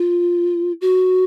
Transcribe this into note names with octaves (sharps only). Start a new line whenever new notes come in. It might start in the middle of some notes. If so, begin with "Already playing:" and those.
Already playing: F4
F#4